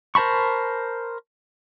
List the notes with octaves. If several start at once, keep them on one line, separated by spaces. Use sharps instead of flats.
A#4 C5 A5 B5 C#6